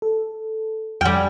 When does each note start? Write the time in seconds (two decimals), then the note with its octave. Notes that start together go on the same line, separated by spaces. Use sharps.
0.02 A4
1.01 F2 G3 G5 G#5 F6